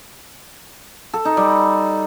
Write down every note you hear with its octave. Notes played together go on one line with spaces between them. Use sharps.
A4
D#4
G3